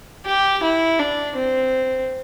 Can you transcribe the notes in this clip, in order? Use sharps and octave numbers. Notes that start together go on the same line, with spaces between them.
G4
E4
D4
C4